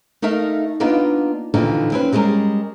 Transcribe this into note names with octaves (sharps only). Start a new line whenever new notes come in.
A3 D#4 A#4 E5 F5
A#3 B3 D4 D#4 F4 B4
D#2 A#2 D3 E3 F3 D#4
C4 C#4 B4
G3 G#3 C#4 E4 G#4 A#4